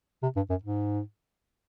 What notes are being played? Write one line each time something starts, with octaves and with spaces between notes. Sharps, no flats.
C3
G2
F#2
G#2